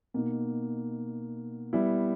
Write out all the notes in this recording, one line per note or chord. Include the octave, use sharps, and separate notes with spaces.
B2 A#3 D#4
G3 B3 E4